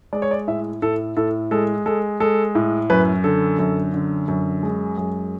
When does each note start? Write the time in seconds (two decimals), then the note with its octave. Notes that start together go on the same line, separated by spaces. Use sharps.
0.13 G#3 D5
0.22 C#5
0.31 D5
0.47 A2 E5
0.82 A2 A4
1.17 A2 A4
1.51 G#3 A4
1.86 G#3 A4
2.20 G#3 A4
2.55 A2
2.90 F#2 B4
3.24 D3 A4
3.59 F#2
3.94 D3
4.28 F#2
4.63 G#3
4.97 F#2 G#4